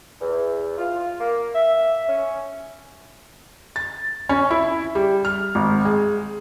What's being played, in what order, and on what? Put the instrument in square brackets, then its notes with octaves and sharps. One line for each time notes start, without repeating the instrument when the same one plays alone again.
[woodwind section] E2
F4
A#3
E5
C#4
[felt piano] A6
C#4
E4
G3
F6
G#1
G#3